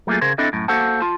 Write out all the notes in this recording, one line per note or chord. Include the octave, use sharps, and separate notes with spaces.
F#3 A3 A#3 F4 G#4
C#3 G#4 A#4 C5
C4 D4 E4 A4 D#5
F#2 A2
A#3 F#4 A4 C5 F#5 A5
F4 A5